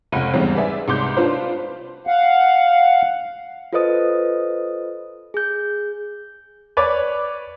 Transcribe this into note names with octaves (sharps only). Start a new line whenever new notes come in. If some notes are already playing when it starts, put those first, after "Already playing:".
F1 C#2 F#5 B5 D#7
E2 G#2 C#3 G3 C4
G#4 B4 D5 E5
C2 G#2 C6 D6 G6
D4 F4 B4 C5
F5 F#5
F4 A4 B4 C5 D#5 D#6
G#4 G6
B4 C#5 D5 D6